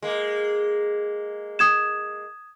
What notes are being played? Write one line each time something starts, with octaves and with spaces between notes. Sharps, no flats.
G#3 A#3
D#6 G#6 E7